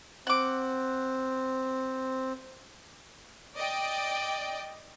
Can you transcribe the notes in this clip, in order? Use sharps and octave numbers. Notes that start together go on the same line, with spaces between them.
C4 F#5 D6
D5 D#5 G5